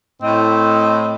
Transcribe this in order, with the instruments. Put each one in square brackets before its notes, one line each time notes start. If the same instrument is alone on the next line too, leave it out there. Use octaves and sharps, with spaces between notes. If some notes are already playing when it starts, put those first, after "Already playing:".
[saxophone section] A2 D#5 [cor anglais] C4